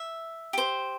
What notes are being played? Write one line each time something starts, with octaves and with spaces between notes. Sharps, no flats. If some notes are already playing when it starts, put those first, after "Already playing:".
Already playing: E5
G4 C5